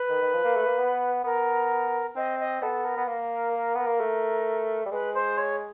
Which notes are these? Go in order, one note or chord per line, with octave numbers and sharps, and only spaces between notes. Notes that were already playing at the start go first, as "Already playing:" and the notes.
Already playing: B4
D#3
D#3
F3
A#3
A3
A#3
B3
B3 A#4
C4 D#5
D#5
B3 A4
A#4
B3
A#3 A#4
A#4
B3 A#4
A#3
A3
G3
G#3 B4
C5
C#5